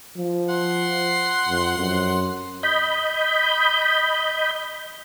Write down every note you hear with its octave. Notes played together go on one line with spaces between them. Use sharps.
F3
F#5 C6
F2
F#2
D#5 B5 G6